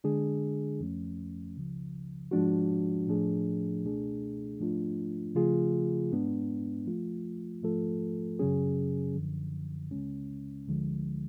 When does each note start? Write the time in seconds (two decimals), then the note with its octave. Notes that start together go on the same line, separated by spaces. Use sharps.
0.04 D3 G#3 D4 G#4
0.80 F2 F3 A3 C#4
1.56 C#2 C#3 F3
2.31 G#2 F3 G#3 D4 F#4
3.07 A2 F3 A3 D4 G#4
3.84 C#2 B2 A3 D4 G#4
4.60 G#2 F3 A3 D4 F4
5.35 C#3 F3 A3 F4 G#4
6.11 G#2 G#3 B3 D4
6.87 F3 A3 F4
7.63 G#2 F3 A3 F4 A4
8.39 F#2 C#3 F#3 C#4 G#4
9.15 F#2 D3 F3
9.91 C#2 C#3 G#3 C#4
10.68 D2 D3 F3 G#3